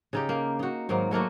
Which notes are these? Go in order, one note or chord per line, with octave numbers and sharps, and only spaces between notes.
C#3 D#4 G4
A#3
D#4 F#4
G#2 D#3 F#3 A#3
F#3 A3 A#3 F#4